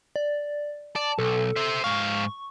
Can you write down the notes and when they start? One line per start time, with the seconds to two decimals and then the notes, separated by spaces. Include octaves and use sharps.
0.16 D5
0.96 D5 A5
1.19 B1 A4
1.56 C5 E5
1.84 G#2 F5 C#6